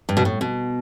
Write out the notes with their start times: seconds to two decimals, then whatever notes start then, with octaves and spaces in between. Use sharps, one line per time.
0.09 G2
0.17 B2
0.25 A2
0.41 B2